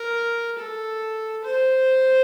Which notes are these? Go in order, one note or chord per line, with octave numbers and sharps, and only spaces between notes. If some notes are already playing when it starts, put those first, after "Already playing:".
Already playing: A#4
A4
C5